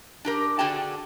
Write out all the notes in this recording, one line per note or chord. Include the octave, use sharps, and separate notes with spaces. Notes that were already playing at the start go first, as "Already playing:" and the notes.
D4 G4 A#4
D3 D4 F#4 G#4 G5 A5